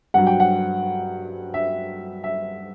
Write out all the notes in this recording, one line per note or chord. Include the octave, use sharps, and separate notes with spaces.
G2 F#3 F#5
G5
F#5
E5
E5